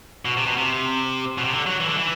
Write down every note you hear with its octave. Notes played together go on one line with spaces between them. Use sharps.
B2
C3
B2
C3
B2
C3
D3
F#3
E3
D3
E3